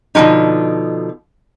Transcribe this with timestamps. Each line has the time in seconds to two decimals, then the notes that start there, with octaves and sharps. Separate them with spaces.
0.15 B2 D3 F3 G#3 D#4